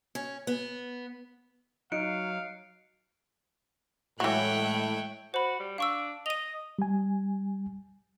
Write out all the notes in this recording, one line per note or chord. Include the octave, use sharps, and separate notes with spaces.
C#4
B3
F#3 D#4 F5 F#6 C#7 D7
A2 E3 F#3 G#3 C#5 E5 G5 F#6
F#4 C5 B5
G3
D4 F5 C#6 E6
D#5 D#7 F7
G3 G#5